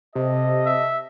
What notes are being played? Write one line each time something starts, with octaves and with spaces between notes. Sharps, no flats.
C3 A4 D#5
E5